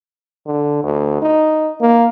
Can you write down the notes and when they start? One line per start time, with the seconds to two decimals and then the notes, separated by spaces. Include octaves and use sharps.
0.47 D3
0.84 D2
1.21 D#4
1.81 A#3